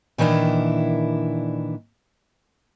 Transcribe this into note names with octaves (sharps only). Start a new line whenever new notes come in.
A#2 D#3 E3 D4 E4